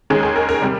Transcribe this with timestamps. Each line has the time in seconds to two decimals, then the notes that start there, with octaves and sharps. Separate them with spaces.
0.10 D#2 D#3 G#3 C#4 G#4
0.23 G#4
0.36 A#4
0.49 A#4
0.62 C3 G3